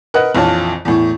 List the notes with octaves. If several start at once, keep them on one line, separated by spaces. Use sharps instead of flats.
A#4 B4 D#5 F#5 F#6
A#1 F2 E3 F4 C#5 A5
E2 A2